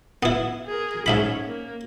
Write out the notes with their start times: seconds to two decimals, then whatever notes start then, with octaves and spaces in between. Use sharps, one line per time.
0.23 B3 E4
0.66 G#4 A#4
1.06 G#2 C#4 E5 B5
1.47 A#3